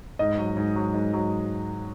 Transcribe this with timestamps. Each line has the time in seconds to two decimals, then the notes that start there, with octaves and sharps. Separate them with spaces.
0.19 G#2 D#5
0.38 F#3
0.57 G#2
0.76 F#3
0.94 G#2
1.13 F#3